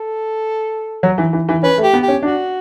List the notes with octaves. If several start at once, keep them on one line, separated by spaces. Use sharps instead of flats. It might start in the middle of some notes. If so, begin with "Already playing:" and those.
Already playing: A4
F#3
E3
E3
E3
C#4 B4
A3
G4
B3
G4
C#4
D4 F#4